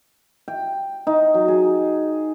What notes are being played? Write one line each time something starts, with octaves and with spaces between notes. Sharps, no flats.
G5
D#4
F#3
G#4